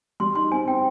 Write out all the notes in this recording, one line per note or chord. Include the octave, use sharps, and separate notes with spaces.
G3 C6
D#4 C6
C4 G#5
C4 G5